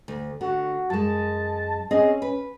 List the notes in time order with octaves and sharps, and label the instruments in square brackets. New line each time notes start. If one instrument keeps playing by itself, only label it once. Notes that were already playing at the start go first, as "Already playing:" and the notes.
[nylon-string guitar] D2
[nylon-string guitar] D3 [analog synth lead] F#4
[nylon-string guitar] F#2 G#3 [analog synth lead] A5
[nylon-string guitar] C4 G#4 D#5 [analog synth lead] C#4
[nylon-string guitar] B4